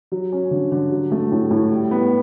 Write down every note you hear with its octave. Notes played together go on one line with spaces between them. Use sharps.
F#3
C#4
D3
D3
F#3
A3
A2
A2
G3
B3